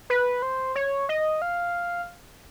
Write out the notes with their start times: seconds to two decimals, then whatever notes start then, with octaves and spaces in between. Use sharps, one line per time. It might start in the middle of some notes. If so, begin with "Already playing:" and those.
0.10 B4
0.42 C5
0.75 C#5
1.09 D#5
1.42 F5